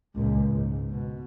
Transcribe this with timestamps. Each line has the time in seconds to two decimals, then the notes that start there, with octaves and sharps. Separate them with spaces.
0.15 C#2 A#2
0.52 G#2
0.90 B2